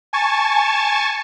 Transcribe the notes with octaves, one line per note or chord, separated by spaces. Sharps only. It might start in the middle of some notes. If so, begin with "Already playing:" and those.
G#5 A5 C#6 A6 C#7 E7